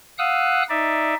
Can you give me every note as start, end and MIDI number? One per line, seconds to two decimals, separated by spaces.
0.18 0.63 77
0.18 0.63 78
0.18 0.63 87
0.18 0.63 88
0.18 0.63 90
0.69 1.14 63
0.69 1.14 74
0.69 1.14 76